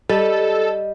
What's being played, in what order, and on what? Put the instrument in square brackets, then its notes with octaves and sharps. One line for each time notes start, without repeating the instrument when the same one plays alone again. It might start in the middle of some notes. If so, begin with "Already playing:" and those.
[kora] G3 [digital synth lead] A4 [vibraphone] D#5